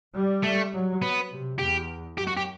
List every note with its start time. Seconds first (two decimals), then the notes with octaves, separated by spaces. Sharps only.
0.14 G3
0.43 A3
0.73 F#3
1.02 B3
1.31 C3
1.59 E2 G4
2.18 F#2 G4
2.27 F#4
2.37 G4